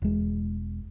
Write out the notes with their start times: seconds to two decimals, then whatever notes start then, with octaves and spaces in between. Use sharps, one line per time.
0.02 E1 G#3